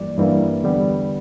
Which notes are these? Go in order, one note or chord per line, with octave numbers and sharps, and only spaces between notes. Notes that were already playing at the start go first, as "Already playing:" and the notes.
Already playing: G2 E3 G3 A#3 D5
G2 E3 G3 A#3
E2 D3 G3 B3